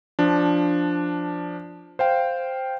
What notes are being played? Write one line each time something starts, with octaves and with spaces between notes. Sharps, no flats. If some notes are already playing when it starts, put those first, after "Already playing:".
F3 D4
C5 F5 G5